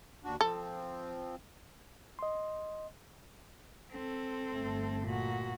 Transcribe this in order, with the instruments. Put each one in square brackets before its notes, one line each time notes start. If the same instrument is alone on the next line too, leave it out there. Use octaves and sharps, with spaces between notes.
[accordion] D#2 D4 F#4
[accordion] F3 C4 [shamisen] A4
[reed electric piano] D#5 C6
[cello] C4 A4
[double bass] G1 A3
[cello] A#2 F#4